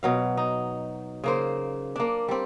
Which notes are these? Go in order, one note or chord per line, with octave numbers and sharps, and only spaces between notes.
B2 F#3 F5
D#4
C#3 A#3 C5
A#3 D4
G3 C4